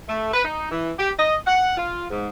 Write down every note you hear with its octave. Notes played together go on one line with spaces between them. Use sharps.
A3
B4
D#4
E3
G4
D#5
F#5
F4
G#2